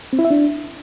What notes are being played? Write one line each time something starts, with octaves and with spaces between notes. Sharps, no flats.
C4
E4
E5
D4